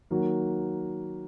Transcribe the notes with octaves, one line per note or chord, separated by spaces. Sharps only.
D#3 F#3 A#3 F#4